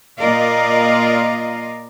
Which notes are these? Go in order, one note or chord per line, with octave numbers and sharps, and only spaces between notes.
A#2 F4 A#4 D5 D#5 F5